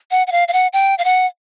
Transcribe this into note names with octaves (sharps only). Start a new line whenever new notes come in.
F#5
F#5
F5
F5
F#5
G5
F5
F#5